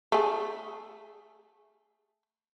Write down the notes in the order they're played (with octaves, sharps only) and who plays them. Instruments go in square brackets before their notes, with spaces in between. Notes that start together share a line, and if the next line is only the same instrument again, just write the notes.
[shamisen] A3 G#4